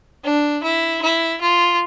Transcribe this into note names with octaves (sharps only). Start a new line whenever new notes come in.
D4
E4
E4
F4